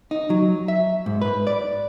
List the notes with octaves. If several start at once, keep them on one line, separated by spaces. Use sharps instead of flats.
D#4
F#3
E5
G#2
B4
D5